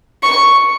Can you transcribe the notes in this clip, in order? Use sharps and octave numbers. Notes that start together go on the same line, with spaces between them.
C#6